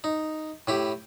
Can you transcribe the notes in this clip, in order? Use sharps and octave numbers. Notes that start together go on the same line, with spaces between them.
D#4
A2 E4 G4